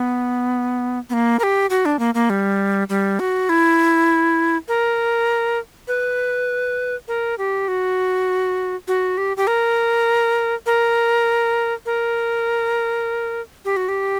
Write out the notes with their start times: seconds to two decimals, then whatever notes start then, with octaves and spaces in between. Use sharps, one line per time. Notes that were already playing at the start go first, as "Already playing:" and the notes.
Already playing: B3
1.10 B3
1.13 A#3
1.39 A#4
1.43 G4
1.70 F#4
1.85 D4
1.99 A#3
2.15 A#3
2.30 G3
2.89 G3
3.19 F#4
3.49 E4
4.68 A#4
5.88 B4
7.08 A#4
7.38 G4
7.68 F#4
8.88 F#4
9.18 G4
9.37 G4
9.47 A#4
10.66 A#4
11.86 A#4
13.65 G4
13.77 F#4
13.88 G4